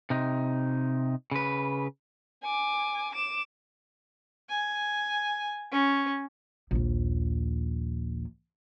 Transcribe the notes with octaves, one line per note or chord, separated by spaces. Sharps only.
C3 D#4
C#3 B4
G#5 D6
D6 E7
G#5
C#4
A#1 D#2